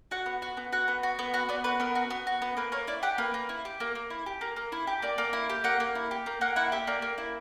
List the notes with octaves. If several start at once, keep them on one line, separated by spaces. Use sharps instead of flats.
F#4 F#5
B3
F#4
B3
F#4 F#5
B3
F#4
B3
F#4 F#5
B3 D5
F#4 B4
B3 A#4
F#4
B3
F#4
B3
A#3 B4
A#3 C#5
E4 D5
G4 F#5
A#3 B4
A#3
E4
G4
A#3
A#3
E4
G4
A#3
A#3
E4
G4
A#3 D5
A#3
E4
G4
A#3 F#5
A#3
E4
G4
A#3
A#3 F#5
E4 F#5
G4 E5
A#3 D5
A#3
E4